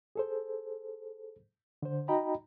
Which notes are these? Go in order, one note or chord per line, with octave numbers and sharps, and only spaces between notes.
G#4 A4 C5
D3 C5
D#4 F#4 D#5 G5 A#5 B5